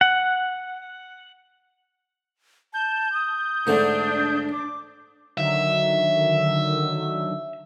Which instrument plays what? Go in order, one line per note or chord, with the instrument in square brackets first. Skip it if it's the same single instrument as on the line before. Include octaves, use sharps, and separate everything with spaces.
[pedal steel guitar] F#5
[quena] A5 [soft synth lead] G6
[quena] D#6
[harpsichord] G#2 D3 A3 [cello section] D4
[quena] D6
[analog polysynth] D3 D#3 F#3 [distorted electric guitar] E5